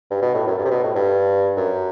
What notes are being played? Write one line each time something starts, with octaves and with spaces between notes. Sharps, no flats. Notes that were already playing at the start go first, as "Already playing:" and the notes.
G2
B2
A2
F#2
G2
C3
B2
A2
G2
F#2